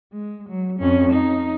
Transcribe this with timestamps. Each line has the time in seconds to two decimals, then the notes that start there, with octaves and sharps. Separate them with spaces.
0.13 G#3
0.49 F#3
0.80 F2 C#4
1.12 D#4